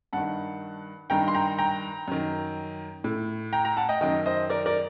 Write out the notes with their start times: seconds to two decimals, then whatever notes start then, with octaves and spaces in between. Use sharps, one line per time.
0.13 G2 D#3 F#5 A5
1.10 G2 D#3 G5 A#5
1.28 C6
1.34 G5 A#5
1.58 G5 A#5
2.08 F#2 D#3
3.04 A2
3.53 G5 A#5
3.65 G5 A#5
3.77 F#5 A5
3.89 D#5 G5
4.01 F#2 D#3 D#5 G5
4.26 C5 D#5
4.50 A#4 D5
4.66 A#4 D5